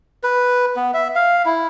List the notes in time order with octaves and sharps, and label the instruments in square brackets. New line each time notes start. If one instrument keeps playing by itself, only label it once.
[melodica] B4
B3
E5
F5
E4